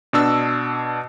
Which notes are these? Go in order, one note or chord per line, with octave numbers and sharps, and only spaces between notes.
B2 D4 E6